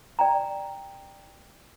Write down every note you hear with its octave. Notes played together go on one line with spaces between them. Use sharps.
D5 G5 A#5